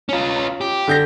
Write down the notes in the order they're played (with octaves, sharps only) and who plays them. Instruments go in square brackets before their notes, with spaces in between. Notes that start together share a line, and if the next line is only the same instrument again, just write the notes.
[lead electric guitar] C#4 F4
G4
[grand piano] D3 G6 A#6